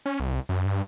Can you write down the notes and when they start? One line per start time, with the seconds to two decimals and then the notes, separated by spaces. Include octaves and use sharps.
0.06 C#4
0.20 C2
0.49 F#2
0.65 G2